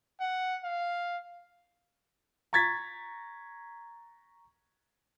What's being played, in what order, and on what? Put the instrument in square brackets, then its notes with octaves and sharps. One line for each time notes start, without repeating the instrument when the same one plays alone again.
[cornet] F#5
F5
[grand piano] A#5 C#6 G#6 A6 B6